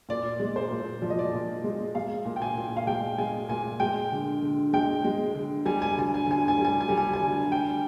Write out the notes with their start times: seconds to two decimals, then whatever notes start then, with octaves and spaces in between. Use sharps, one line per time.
0.09 A#2 D5
0.40 G#3
0.56 C5
0.71 A#2
1.02 F3 D5
1.10 D#5
1.19 D5
1.33 A#2
1.64 G#3
1.95 G#3 F5
2.25 A#2
2.36 G5
2.42 G#5
2.57 A#2
2.77 F5
2.87 G#3 G5
3.18 G#3 G#5
3.49 A#2 G#5
3.80 G#3 G5
4.12 D3
4.42 D3
4.73 G#3 G5
5.05 G#3
5.35 D3
5.66 G3 G#5
5.82 G#5
5.97 D3 G#5
6.14 G#5
6.27 D3 G#5
6.48 G#5
6.58 G3
6.65 G#5
6.81 G#5
6.89 G3
6.97 G#5
7.13 G#5
7.21 D3
7.51 D3 G5